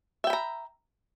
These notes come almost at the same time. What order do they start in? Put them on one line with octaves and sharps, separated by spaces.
E5 G5 B5 A#5